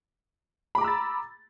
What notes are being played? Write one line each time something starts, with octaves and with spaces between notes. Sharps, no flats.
A#5 B5 D6 E6 A6